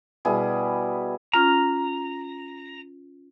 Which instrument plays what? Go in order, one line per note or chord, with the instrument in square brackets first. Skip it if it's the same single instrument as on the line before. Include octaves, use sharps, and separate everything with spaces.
[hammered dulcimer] B2 G3 E4 G#4
[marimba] C#4 F4 F6 [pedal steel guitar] A#5